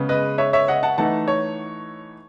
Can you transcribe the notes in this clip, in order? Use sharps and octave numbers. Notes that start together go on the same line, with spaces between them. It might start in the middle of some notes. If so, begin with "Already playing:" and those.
Already playing: C#3 G#3 B3
B4 D#5
C#5 E5
C#5 E5
D#5 F#5
F#5 A5
E3 A3 D#4 F#5 A5
C#5